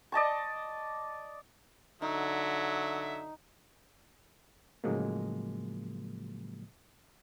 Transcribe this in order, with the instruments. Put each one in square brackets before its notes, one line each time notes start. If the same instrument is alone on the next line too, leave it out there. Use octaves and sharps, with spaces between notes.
[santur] D5 D#5 A5 C#6
[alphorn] D3 [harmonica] F#3 E5 [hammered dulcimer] D#4
[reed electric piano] A2 C#3 F3 F#3 G#3 A#3